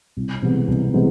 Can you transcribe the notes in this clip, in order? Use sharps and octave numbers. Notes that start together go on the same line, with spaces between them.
C2
C3 E3 G#3 B3
C2
C3 E3 G#3 B3